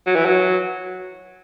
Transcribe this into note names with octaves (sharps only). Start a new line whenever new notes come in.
F#3
E3
F#3